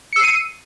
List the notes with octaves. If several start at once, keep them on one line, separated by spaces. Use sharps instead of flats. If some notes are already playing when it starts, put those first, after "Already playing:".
E6 C7 C#7 D#7